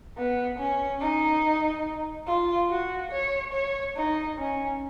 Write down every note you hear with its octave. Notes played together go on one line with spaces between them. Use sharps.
B3
C#4
D#4
F4
F#4
C#5
C#5
D#4
C#4